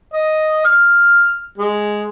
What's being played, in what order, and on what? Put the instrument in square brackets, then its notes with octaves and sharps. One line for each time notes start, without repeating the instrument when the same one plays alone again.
[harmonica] D#5
F6
G#3